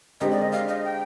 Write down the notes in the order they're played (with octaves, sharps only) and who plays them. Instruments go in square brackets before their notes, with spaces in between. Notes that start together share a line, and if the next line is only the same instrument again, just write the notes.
[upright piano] D3 G#3 C4 G4 A#4 [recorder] D#5
[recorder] D5
D#5
F5
D#5
G5